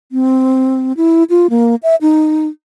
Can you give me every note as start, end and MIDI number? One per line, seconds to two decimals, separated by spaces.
0.12 0.93 60
0.97 1.24 64
1.30 1.47 65
1.50 1.75 58
1.83 1.95 76
2.01 2.47 63